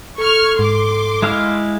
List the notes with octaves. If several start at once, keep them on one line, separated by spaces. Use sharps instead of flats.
A4 C#6 F6 G#6
G#2 C6 D6
G#3 E4 F5